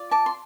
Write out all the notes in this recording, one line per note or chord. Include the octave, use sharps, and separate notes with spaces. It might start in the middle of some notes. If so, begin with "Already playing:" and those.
Already playing: F4 D5
A5 D6
C6